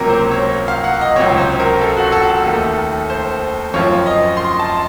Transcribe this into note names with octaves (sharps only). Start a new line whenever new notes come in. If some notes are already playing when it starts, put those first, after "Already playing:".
Already playing: C#2 C3 F#3 A#3 A#4
C5
C#5
F5
F#5
D#5
C#2 C3 F#3 C4 C#5
C5
A#4
A4
F#4
A4
A4
D#2 D#3 A3
C5
F#2 F3 C4 F4 C#5
D#5
C6
A5